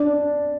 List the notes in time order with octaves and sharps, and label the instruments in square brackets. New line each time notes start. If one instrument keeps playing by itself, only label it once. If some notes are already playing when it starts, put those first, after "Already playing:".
Already playing: [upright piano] D4